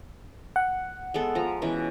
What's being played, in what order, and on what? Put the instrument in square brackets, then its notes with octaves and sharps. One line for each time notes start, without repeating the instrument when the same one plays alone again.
[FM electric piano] F#5
[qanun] G#3 B3 A4
F3 A#5
B2 E3 C#4